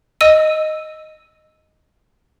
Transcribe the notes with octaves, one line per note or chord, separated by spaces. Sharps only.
D#5 E6 D#7